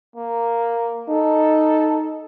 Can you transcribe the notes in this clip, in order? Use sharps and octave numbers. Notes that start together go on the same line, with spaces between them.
A#3
D#4 A4